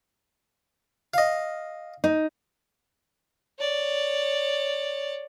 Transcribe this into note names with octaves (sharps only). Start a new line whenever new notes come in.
D#5 F5
D#4
C#5 D5